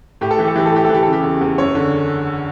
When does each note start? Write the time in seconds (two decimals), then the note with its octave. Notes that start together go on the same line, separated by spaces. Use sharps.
0.21 A2 G4
0.31 A4
0.39 E3 G4
0.48 A4
0.56 E3 G4
0.66 A4
0.72 A2 G4
0.85 A4
0.89 E3
0.95 G4
1.03 A4
1.07 C#3
1.13 G4
1.24 E2
1.41 E2
1.58 F#2 C#5
1.75 D3